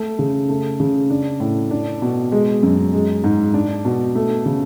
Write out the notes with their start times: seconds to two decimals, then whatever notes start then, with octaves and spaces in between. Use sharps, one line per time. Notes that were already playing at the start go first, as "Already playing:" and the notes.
Already playing: A3
0.19 C#3
0.49 A3
0.80 C#3
1.10 D4
1.40 A2
1.71 D4
2.02 B2
2.32 G#3
2.63 F#2
2.94 G#3
3.24 G#2
3.54 D4
3.85 B2
4.15 A3
4.46 C#3